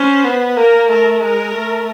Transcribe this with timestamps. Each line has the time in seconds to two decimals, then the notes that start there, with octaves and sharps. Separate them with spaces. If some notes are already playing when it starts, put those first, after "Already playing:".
Already playing: C#4 C5
0.24 B3
0.56 A#3 A#4
0.89 A3 A#4
1.22 G#3 A#4
1.54 A3